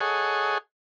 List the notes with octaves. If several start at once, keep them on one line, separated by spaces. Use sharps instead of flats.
G#4 A4 C#5 D#5 F#5 G#5